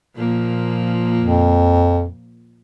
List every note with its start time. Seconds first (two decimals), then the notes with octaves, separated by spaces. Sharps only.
0.16 A#2 F3 A#3
1.21 F2